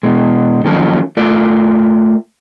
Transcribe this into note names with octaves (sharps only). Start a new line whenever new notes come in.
B2 G#3
D#3 F3 F#3 A#3 C#4 A4
A3 F4 A4 A#4 D5